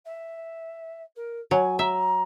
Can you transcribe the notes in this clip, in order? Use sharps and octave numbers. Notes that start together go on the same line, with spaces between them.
E5
A#4
F#3 G#5
E5 A#5